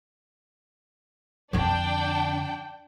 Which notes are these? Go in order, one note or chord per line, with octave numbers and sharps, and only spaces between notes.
F2 D3 D4 G5